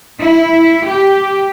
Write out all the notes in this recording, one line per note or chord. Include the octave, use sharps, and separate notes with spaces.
E4
G4